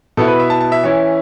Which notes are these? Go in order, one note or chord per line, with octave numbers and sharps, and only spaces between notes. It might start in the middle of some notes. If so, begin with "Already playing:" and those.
B2 B3 E4 A4
B4
E5
A5
A5
E5
E3 C#4 E4 C#5